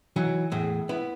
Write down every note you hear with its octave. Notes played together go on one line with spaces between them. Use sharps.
E3 F#3 D#4
E2 A2
B3 E4